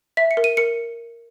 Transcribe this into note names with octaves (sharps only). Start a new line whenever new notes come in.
E5 B6
C#7
A#4
D#7
A#4 C#7